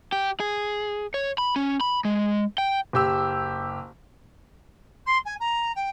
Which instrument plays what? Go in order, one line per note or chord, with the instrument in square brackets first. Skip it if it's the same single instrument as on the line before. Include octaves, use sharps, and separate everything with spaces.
[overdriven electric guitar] G4
G#4
C#5
B5
C#4
B5
G#3
G5
[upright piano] F#1 G4 E6
[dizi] C6
G#5
A#5
G5